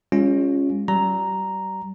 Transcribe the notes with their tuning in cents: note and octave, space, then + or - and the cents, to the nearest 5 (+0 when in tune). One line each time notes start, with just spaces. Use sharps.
G#3 -35 C#4 +0 F4 +0
G3 -35 A#5 +0